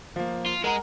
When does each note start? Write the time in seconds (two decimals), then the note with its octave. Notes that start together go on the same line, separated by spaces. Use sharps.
0.16 F3 A#3
0.46 F4
0.64 G#3 G#4 A#4 F#5 A#5